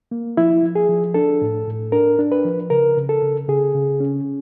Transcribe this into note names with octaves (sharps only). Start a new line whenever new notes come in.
A#3
F3 E4
F3
G#4
F3
D4 A4
A2
A2
D4 A#4
D4
B4
F3
C#3 A#4
C#3
A4
C#3
C#3 G#4
C#3
C#4